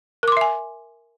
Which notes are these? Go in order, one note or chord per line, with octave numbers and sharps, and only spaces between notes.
A#4 E5 G#5 C6 D6